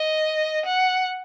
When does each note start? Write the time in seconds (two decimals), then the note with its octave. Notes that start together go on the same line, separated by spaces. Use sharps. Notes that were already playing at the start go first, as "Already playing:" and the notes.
Already playing: D#5
0.66 F#5